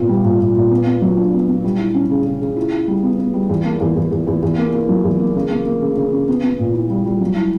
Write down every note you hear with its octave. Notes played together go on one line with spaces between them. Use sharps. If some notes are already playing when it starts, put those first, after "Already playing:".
Already playing: A#2 B3
G3
A#2
A#2
A#2
B3
B3
F#3
D4
B3
B3
G3
E4
C#4
C#3
C#3
C#3
E4
E4
G3
B3
B3
G3
E2
A#3
E2
E2
E2
E2
E2
A#3
A#3
F#3
E2
A#3
C#3
A#3
A#3
C#3
C#3
C#4
B3
B3
A#2
E4
G3
G3
F#3
E4